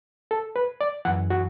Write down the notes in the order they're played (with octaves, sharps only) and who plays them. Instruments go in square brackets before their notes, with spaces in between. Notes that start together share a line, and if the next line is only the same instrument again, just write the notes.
[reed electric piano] A4
B4
D5
F#2 E3 F#5
F#4